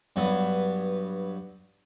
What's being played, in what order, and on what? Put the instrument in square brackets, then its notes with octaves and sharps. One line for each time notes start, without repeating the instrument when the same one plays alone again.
[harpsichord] G2 F#3 B3